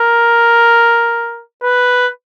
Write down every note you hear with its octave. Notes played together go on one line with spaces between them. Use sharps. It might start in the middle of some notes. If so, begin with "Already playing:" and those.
Already playing: A#4
B4